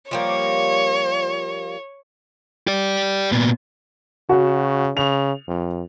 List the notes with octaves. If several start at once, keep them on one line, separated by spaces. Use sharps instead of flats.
F3 G3 A#3 C#5
G4 D5
A#2 B3
C#3 F#4
C#3 F7
F2